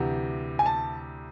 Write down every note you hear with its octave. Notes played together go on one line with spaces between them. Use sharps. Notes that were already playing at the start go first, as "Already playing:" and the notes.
Already playing: D2 C3 E3
G#5
A5